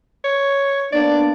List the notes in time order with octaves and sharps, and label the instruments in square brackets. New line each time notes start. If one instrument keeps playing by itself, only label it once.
[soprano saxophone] C#5
[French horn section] A#3 B3 D4 [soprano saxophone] D5